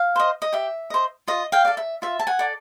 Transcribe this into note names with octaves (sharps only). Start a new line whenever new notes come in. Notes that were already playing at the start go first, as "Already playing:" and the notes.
Already playing: F5
C5 D#5
D#5
G4 E5
C5 D#5
F4 D#5
F5 G5
A4 D5
E5
F4 E5
A5
F#5 G#5
A4 D5